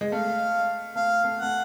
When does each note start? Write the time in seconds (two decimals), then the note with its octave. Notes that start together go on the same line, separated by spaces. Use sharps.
0.01 G#3
0.12 A3 F5
0.96 A3 F5
1.24 A3
1.38 A3 F#5